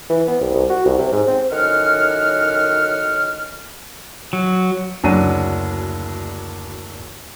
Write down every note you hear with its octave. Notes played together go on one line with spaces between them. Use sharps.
E3
B3
C2
C2
F#4
C2
C3
G#2
C4
F#2 A2 D#3 F#5 F6
F#3
F#1 D2 F#3 D4 D#7